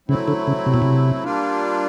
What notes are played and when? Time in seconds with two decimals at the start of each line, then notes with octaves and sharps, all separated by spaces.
0.08 C#3 F#3 A3 C4 E4
0.28 D3
0.47 C#3
0.66 C3
0.74 B2
0.82 C3
1.23 G3 A#3 D4 F4